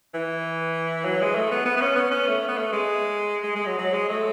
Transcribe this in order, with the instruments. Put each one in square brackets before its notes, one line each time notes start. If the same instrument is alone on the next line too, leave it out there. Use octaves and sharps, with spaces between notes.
[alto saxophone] E3
F#3
G#3
A3
B3
B3
B3
C#4
B3
C#4
A3
B3
A3
G#3
G#3
G#3
F#3
F#3
G#3
A3